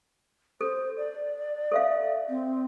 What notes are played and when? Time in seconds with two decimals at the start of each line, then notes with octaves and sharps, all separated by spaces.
0.61 A4 C5
0.97 D5
1.72 A4 E5 F5
2.28 C4